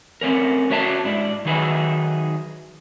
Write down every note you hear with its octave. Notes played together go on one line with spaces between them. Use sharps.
A3 C4 C#4 A#4
C#4 F#4 C#5 E5 G5 A5
G#2 D4 E4
D#3 F#3 D#4 G#4 B4 E5